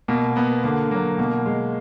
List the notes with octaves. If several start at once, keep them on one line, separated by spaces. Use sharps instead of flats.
B2 A#3
A#3 B3
D3 A#3
F#3 A#3
B2 A#3
G#3